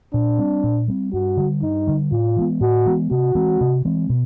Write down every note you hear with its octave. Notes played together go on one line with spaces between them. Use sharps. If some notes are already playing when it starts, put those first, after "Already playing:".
A#2 D4
G3 C4
A#2
G3 C4
G2 F#4
D3 G3
G2 D#4
D3 G3
A2 F4
E3 G#3 B3
A2 F#4
E3 G#3 B3
C3 F#4
E3 G#3 C4
C3
E3 G#3 C4
B2